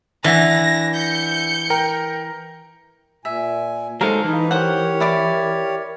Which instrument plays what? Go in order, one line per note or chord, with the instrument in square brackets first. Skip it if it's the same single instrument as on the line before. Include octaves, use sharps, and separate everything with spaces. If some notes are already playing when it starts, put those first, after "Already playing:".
[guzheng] E3 [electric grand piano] D4 E5 F#5 [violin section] A#6
[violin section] G6 C#7
[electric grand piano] A#4 G5 A#5
[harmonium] A#2 G#5 [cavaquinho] E5
[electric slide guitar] F#3 G#3 D#4 [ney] A4 [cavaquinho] A#4 F5 A5 [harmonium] C5
[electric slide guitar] E3 [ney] D#4 [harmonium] B4
[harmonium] G4 C#5 [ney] A#4 [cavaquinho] C5 F#5
[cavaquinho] E4 D5 D6